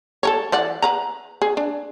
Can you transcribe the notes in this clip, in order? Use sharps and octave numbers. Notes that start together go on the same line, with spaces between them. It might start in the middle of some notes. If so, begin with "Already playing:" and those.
A4 A#4 C#5
E3 D5 F#5
B4 F#5 A#5
G#4
D4